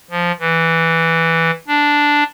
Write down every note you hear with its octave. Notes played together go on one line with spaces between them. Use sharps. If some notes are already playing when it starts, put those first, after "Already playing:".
F3
E3
D4